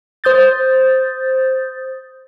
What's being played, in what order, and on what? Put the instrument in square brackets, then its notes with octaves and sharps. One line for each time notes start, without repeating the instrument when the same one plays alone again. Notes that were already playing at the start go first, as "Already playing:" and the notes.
[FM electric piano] C5 D#6 G6 A6